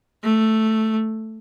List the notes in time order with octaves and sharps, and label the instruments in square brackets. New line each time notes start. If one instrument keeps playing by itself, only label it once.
[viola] A3